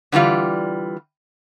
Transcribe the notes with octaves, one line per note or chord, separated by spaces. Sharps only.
D3 E3 G3 F4 D5